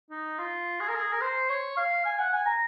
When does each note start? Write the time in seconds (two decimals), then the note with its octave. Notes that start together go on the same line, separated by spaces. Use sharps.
0.11 D#4
0.38 F4
0.80 G#4
0.88 A#4
0.96 G#4
1.12 A#4
1.21 C5
1.50 C#5
1.77 F5
2.05 G#5
2.19 F#5
2.33 G#5
2.46 A#5